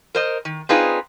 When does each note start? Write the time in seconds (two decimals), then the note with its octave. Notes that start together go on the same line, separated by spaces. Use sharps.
0.15 A#4 C5 D#5
0.45 D#3
0.69 C4 D4 D#4 F4 G#4 B4